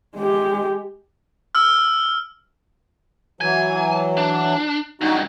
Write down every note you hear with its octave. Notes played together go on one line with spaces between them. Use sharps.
G#3 G4
E6 F6
E3 F#3 G#5
D4
C#2 G2 D#4 F#4